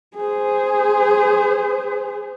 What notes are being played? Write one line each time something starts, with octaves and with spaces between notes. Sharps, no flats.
G#4 C5